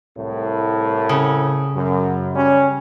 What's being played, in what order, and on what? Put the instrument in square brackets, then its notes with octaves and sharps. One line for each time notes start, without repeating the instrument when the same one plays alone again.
[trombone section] C2 A2
[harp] C#3
[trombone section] F#2
G3 C#4